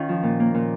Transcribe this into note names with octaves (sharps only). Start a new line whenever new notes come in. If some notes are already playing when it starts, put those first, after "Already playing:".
Already playing: D#3 C#4 F4
F3
A#2
A#3
A#2